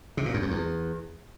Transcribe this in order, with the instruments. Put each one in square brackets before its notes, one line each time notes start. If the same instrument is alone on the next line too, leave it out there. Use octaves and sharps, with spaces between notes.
[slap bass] C3
A#2
F#2
F2
E2